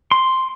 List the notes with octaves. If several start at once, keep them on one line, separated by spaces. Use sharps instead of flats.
C6